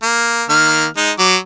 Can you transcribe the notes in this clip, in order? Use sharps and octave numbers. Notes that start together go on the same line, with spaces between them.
A#3
D#3 A#3 F6
G#3 D#4
F#3 D6